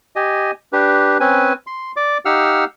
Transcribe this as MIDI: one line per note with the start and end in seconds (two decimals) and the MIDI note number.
0.16 0.51 67
0.16 0.51 75
0.16 0.51 80
0.73 1.18 62
0.73 1.18 67
0.73 1.18 71
1.20 1.53 60
1.20 1.53 61
1.20 1.53 71
1.20 1.53 80
1.67 1.92 84
1.96 2.18 74
1.96 2.18 86
2.25 2.64 63
2.25 2.64 67
2.25 2.64 77
2.25 2.64 78
2.25 2.64 88
2.25 2.64 89